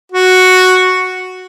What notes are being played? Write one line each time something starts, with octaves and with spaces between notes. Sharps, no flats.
F#4